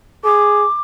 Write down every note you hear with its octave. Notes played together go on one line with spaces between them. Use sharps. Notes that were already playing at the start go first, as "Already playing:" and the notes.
G#4 D6